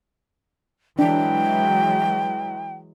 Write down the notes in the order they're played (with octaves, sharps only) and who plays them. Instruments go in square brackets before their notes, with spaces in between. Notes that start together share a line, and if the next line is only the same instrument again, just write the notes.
[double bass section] E3 F#3 G#3 [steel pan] D4 [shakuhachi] G5